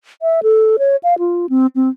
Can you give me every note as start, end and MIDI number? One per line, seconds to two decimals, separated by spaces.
0.22 0.40 76
0.43 0.77 69
0.79 0.96 73
1.03 1.18 77
1.19 1.46 65
1.49 1.67 60
1.76 1.89 60